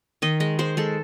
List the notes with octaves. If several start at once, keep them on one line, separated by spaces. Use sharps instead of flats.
D#3 D#5
G#3 D#5
G#3 C5
G#3 A4